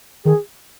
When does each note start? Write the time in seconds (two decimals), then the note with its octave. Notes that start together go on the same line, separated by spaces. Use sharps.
0.25 D#3 G#4